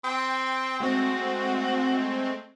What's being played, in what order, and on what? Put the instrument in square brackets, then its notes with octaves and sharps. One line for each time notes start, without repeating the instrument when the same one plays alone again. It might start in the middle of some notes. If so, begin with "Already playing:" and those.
[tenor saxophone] C4 [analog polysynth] G5
[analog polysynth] G#3 A3 C4 [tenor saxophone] F#4